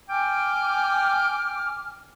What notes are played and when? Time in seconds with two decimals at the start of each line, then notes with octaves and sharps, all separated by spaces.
0.09 G5 G#5 D6 F6